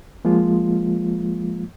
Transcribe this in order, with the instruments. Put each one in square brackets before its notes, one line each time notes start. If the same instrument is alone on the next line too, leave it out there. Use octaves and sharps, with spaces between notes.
[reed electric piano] F3 G#3 A#3 F4